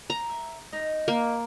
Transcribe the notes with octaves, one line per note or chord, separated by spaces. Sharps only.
A#5
E5
D#4 D#5
A#3